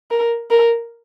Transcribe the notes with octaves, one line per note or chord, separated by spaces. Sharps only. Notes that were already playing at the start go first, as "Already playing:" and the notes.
A#4
A#4